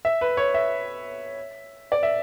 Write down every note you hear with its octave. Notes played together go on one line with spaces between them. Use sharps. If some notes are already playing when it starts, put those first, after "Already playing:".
E5
B4
C#5
E5
D5
E5